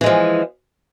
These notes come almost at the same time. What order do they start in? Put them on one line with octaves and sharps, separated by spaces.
E3 G#3 F3